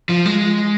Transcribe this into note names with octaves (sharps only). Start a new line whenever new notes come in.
F3
G#3